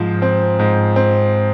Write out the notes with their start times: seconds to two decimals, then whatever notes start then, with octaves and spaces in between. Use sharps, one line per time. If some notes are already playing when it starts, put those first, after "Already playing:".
Already playing: G#2 F3 C4
0.22 C4
0.59 G#2
0.96 C4